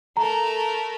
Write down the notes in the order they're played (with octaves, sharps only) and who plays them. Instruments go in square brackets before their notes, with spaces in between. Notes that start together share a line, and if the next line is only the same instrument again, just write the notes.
[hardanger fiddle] A3 A#4 [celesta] A#5